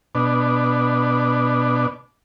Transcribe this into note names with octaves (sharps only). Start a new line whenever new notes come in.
B2 D4